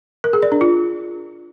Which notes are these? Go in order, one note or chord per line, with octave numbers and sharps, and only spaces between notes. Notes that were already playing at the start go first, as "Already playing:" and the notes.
A#4
G#4
D5
D4
F4